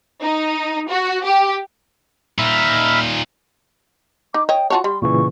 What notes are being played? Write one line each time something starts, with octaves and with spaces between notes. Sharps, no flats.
D#4
F#4
G4
A#2 D#4 E5 B5 F6
D#4 D6
C#5 D#5 G5
F4 F#4 C#5 A5
G3 C6
A#2 C#3 E3 C#6